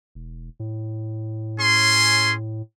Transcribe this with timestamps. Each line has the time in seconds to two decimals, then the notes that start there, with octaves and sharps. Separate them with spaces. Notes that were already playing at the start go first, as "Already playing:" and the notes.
0.15 E1
0.60 A2
1.58 C#4 G#4 C6